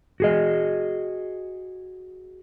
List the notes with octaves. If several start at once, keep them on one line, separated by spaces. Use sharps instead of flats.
F#4 G#4 D#5